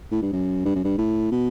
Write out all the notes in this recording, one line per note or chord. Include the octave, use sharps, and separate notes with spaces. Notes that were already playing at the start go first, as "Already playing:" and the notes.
A2
G2
F#2
G2
F#2
G2
A2
B2